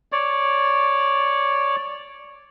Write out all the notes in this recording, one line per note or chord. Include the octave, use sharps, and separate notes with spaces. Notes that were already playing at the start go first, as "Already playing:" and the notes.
C#5 D5